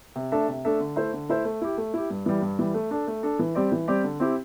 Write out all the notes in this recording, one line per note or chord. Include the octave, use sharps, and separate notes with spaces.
C3
A3 D4 A4 E5
C3
A3 D4 A4 E5
D3
A3 E4 C5 E5
D3
A3 E4 C5 E5
A3
E4 G4
A3
E4 G4
G2
E3 G3
G2
E3 G3
A3
D4 A4
A3
D4 A4
E3
G3 C4 G4 D5
E3
G3 C4 G4 D5
D3
C4 E4 G4